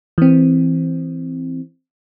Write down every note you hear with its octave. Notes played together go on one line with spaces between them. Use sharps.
E3 C4